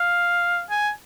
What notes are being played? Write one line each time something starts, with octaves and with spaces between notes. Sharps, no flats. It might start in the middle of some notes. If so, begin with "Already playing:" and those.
Already playing: F5
G#5